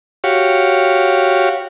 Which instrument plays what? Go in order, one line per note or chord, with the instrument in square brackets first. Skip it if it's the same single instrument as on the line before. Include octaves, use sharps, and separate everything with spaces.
[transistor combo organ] F#4 G4 C#5 F5